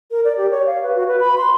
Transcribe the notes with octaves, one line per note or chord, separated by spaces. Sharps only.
A#4
D5
G4
C#5
F5
B4
F#4
B4
B5
C6